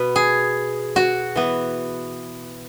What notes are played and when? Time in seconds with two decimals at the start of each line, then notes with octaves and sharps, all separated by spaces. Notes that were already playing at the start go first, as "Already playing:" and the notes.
Already playing: B2 B3 B4
0.16 G#4
0.96 F#4
1.36 E3 B3